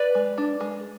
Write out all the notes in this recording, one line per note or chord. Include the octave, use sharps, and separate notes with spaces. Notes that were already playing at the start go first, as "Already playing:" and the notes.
Already playing: B4 D5
G#3
D4
G#3